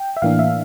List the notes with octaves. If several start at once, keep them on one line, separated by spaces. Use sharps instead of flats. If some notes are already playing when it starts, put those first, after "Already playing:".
Already playing: G5
E5
A2 E3 A#3 D4 F5
E5